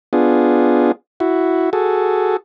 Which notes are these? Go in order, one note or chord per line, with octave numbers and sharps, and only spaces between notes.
B3 D4 F4 G#4
E4 F#4
F#4 G#4 A4